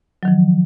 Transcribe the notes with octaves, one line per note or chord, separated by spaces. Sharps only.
D#3 F3 F#3